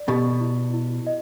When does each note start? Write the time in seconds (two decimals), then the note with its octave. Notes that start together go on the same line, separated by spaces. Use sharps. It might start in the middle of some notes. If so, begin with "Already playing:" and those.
Already playing: D5
0.08 B2 G4
0.41 E4
0.74 E4
1.07 D#5